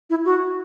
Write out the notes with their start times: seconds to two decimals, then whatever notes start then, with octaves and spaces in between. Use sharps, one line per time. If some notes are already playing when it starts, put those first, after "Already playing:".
0.10 E4
0.25 F#4